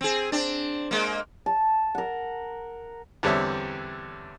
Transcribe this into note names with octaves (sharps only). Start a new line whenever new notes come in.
C4 G#4
C4 D4
G#3 A#3
A5
A#4 F#5
E2 D3 G3 C4 C#5 E5